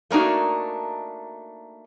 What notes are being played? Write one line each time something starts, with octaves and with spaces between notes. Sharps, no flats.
A3 A#3 D4 D#4 F#4